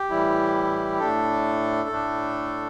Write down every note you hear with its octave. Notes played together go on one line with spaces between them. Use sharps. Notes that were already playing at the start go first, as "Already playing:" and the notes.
Already playing: G4
A2 E3 G3 E4
A2 A3 D4 A4
A2 A3 D4